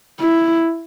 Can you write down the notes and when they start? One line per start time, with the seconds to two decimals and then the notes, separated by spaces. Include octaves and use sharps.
0.20 E4